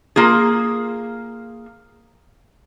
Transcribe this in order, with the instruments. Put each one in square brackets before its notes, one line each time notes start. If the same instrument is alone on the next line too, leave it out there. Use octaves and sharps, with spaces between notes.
[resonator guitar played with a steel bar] A#3 F4 G#4